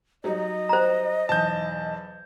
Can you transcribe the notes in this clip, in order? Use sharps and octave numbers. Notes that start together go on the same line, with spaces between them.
F#3 G3 D#4 D#5
C5 A#5
B1 E2 A5 G6